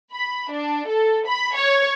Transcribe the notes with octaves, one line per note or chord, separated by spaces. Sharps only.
B5
D4
A4
B5
C#5